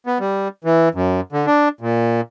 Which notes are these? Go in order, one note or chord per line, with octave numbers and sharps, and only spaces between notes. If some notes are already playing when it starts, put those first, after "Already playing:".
B3
G3
E3
F#2
D3
D4
A#2